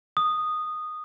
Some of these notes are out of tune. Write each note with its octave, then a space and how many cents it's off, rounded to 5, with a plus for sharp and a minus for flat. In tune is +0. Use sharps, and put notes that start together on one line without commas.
D#6 -10